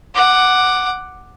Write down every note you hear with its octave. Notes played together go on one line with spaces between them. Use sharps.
F#5 D6